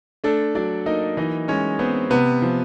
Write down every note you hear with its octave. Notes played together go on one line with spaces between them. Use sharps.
A3 D4 A4
F#3 D4 D5
A#3 D#4 D#5
E3 D#4 D#5
G#3 C#4 C#5
B3 C4 C5
C3 B3 B4
F3